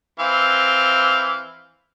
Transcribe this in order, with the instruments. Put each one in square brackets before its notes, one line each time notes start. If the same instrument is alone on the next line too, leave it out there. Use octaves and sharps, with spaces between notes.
[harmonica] E3 C4 F5